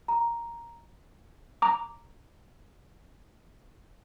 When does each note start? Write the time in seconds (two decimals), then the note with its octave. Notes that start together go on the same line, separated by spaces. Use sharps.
0.08 A#5
1.62 A#5 D6